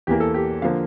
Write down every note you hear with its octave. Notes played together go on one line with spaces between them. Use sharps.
E2 E3 A#3 G4
A4
G4
D3 F3 A#3 F5